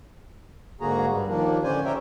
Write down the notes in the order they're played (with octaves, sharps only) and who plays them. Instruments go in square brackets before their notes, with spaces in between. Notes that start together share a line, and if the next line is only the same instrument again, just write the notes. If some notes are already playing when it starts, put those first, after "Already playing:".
[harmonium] G#2 D3 A#3 F#4 G#4 A#5
G2 G3
D#2 D#3 F3 A#3 D4
A2 D3 C#4 C5 D5 G#5
G4 A#4 C5 C#5 E5 G5